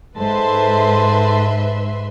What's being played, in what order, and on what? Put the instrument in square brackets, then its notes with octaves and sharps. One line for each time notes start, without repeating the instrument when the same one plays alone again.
[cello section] G#2 [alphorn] A4 [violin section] B4 E5 C6 [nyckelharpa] C5 A5